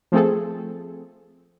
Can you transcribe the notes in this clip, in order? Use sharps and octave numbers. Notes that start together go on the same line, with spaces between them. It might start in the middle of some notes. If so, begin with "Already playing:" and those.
F3 A3 C4 G#4 A4